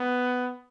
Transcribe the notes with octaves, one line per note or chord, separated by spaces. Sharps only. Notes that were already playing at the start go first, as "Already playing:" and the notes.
Already playing: B3